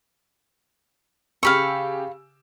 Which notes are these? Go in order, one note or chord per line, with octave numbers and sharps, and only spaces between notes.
C#3 G4 F5 B5 C#6 E6